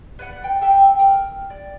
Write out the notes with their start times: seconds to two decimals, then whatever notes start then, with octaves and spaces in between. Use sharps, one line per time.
0.19 B4 D5 F#5
0.44 G5
0.61 A4 E5 G5
0.99 A#4
1.50 D5